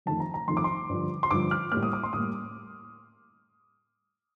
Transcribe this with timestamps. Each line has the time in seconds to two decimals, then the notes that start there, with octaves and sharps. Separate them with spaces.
0.06 F2 D#3 A3 A5
0.20 A#5
0.34 A#5
0.48 F2 D#3 A3 C6
0.57 D6
0.64 C6
0.89 G2 D3 F3
1.23 C6
1.31 G2 D3 F3 D6
1.51 F6
1.72 A2 G3 A#3 F6
1.83 D#6
1.93 D6
2.03 C6
2.13 A2 G3 A#3 D#6